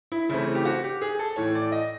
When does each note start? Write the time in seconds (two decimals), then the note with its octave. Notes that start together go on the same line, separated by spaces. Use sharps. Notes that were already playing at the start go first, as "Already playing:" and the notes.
0.12 E4
0.29 C#3 E3 A3 C4 E4
0.55 G4
0.65 F#4
0.84 G4
1.02 G#4
1.19 A4
1.36 A2 E3 A3 C#5
1.55 D5
1.72 D#5